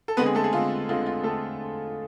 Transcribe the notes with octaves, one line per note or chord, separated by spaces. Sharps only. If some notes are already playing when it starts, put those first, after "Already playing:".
A4
D3 G#3 B3 C4 B4
G#4
A3 A4
G#4
D3 G#3 C4 F4
D3 G#3 C4 F4
F4
D3 G#3 A3 C4 A4